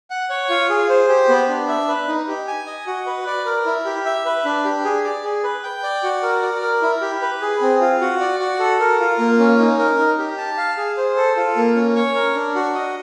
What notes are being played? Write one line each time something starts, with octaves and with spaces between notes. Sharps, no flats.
F#5
C#5
F4
G#4
C5
G4
B3
D4
E5
B4
D#4
G4
G#5
D#5
F#4
B4
D5
A#4
E4
G4
E5
B4
D4
G4
G#4
D5
G#4
B4
G5
D5
F#4
A#4
D5
A#4
E4
G4
B4
G#4
C4
F4
F#4
D5
F#4
A4
A#4
F4
A#3
C#4
D#4
A#4
D#4
G4
A5
F5
G#4
C5
A4
F4
A#3
C#4
C#5
A#4
D4
F#4
D#5